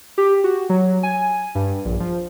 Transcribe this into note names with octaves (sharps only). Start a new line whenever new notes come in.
G4
F#4
F#3
G#5
G2
A#1
F3